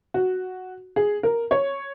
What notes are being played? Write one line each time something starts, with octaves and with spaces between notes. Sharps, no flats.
F#4
G#4
A#4
C#5